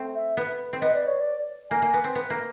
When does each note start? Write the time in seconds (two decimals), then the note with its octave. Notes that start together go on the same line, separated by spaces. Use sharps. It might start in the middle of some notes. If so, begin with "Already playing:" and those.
Already playing: A3 C4
0.15 E5
0.37 B3
0.73 C4
0.82 B3 D#5
0.94 D5
1.07 C#5
1.20 D5
1.71 A#3 G#5
1.82 A#3
1.94 B3
2.04 C4
2.15 B3
2.30 A#3